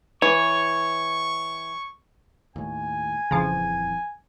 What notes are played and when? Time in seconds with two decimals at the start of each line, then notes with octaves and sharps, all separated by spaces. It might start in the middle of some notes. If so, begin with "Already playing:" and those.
0.22 E3 C#5 C#6
2.56 D#2 A2 G#5
3.31 D#1 F2 C#3 E3 F3